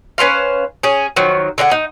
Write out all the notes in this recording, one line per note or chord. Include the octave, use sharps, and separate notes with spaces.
C#4 B4 C5 F5
C#4 G#4
D#3 F3 F#3
D3 G#4 D5 F#5
D#4